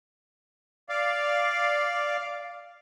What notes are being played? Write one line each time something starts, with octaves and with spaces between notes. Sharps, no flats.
D5 F5